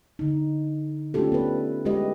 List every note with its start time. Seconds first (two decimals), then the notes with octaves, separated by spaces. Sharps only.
0.19 D3 D#4
1.14 A3 C#4 D4 F4 G4 A4
1.32 B3 B4
1.85 G3 G#3 E4 G4 B4 D#5